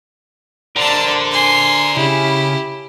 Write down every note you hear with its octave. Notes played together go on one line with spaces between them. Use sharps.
D3 A#4 C5 D5 A5
G#5 C6
C#3 E4 G4